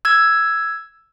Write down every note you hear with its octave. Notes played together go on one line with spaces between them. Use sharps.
E6 G#6